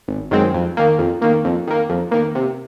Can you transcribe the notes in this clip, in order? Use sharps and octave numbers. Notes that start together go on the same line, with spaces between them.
G#1
F#2 D#3 G#3 C4
F2
D#3 A#3
F2
D#3 A#3
F2
D#3 A#3
F2
D#3 A#3
C3